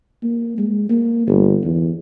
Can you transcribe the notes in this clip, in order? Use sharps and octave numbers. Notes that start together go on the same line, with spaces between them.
A#3
G#3
A#3
G1
E2